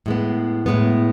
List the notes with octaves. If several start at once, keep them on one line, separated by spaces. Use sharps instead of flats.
A2 G#3 B3
A2 G#3 B3